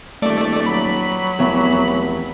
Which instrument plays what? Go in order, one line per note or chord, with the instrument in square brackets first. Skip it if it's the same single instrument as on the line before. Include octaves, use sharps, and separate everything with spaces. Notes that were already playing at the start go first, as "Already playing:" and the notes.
[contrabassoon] D#1 [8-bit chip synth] A3 D5
[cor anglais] F#3 [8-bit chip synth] B5
[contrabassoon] F1 [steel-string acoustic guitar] E2